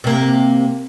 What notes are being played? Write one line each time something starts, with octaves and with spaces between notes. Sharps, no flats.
C3 A#3